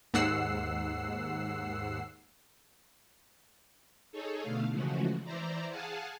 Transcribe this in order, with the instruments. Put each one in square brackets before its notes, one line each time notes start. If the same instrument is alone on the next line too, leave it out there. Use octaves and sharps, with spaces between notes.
[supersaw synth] D#2 G#2 F#5 E6 C7
[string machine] D#4 G#4 A4 C#5
B2 D3 A3 F5
C#3 E3 F3 G#3 A3 F#4
E3 E4 C5 D5 A#5
G#4 F5 F#5 G#5 A5